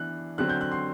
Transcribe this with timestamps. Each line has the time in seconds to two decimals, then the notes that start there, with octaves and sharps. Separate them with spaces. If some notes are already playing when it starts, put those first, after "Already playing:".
Already playing: E3 B3 D4 F#6
0.38 D3 F#3 C4 F#6
0.49 G6
0.61 F#6
0.72 C6